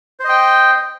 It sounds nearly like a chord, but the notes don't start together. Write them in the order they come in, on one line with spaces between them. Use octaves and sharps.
C5 D#5 G5